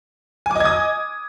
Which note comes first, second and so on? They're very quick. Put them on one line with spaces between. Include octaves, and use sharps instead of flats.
G#5 D6 D#5 G#6 D#6